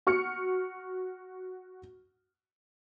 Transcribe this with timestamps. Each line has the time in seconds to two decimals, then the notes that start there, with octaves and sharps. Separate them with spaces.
0.07 F#4 C#6 F6 C#7